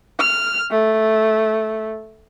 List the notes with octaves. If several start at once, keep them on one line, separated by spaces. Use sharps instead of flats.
F6
A3